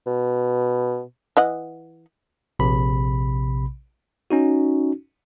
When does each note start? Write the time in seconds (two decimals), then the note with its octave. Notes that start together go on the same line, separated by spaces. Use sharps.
0.07 B2
1.37 E3 D#5 F#5
2.59 A#1 C3 B5
4.31 C#4 D#4 F#4